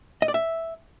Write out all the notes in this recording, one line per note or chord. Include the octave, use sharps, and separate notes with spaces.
D#5
D5
E5